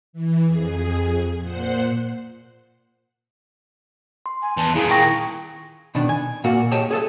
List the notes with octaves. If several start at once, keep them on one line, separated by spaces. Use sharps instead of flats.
E3
F2 G#4
A#2 C5 F#5
C6
G#5
E2 A5
D#2 A#2 E4 G#4
G5 C#6 A#6
B2 D#3 D4
G#5
A#2 A#3 F#4
G4 G#4 C#5 D#5 G5 A5
G#4 A4 E5